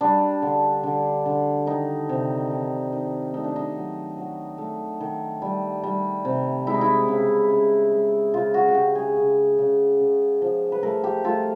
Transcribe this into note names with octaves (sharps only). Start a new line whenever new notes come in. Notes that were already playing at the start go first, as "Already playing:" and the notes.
G3 D4
D3
D3
D3
D#3 D#4
C3
D#3
D#3
A3 D#4
D4
D#4
F#3
F#3
A3
D#3
G3
G3
C3
G#3 E4
D#4
E4
C#3
C#3
G#3
C#3 F4
F#4
F#4
C#3 G4
G#4
C#3
C#3
C#3
F3
B4
A3 A#4
G4
A3 F4